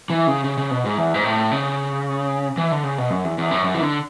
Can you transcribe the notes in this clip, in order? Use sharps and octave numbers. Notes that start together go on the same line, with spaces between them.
E3
C#3
C#3
C#3
B2
G#2
E2
G#2
A2
C#3
E3
D3
C#3
B2
F#2
E2
E2
F#2
F#2
E3
D3